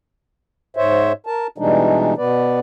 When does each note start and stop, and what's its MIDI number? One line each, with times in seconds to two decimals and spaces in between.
0.77 1.12 44
0.77 1.12 72
0.77 1.12 73
0.77 1.12 76
1.26 1.47 70
1.26 1.47 81
1.58 2.14 47
1.58 2.14 52
1.58 2.14 55
1.58 2.14 56
1.58 2.14 62
1.58 2.14 63
2.17 2.60 47
2.17 2.60 59
2.17 2.60 71
2.17 2.60 74